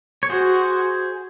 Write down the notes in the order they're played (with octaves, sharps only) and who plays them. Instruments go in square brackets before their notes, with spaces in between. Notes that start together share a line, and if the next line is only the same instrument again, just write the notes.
[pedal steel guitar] C#5
[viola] F#4 [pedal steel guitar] G#4 C5